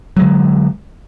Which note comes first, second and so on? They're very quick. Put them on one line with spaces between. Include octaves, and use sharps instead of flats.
F#3 G#3 D3